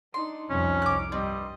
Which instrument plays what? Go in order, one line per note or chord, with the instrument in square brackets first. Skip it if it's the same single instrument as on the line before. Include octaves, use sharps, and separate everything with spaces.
[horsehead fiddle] D4 D#4 [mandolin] C6
[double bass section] C2 F2 [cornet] C#4
[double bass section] C2 [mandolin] D6 F#6
[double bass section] G2 [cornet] G3 [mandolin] C4 [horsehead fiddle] D#5